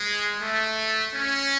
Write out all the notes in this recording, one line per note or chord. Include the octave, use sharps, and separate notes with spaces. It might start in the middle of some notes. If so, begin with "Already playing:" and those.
Already playing: G#3
A3
C#4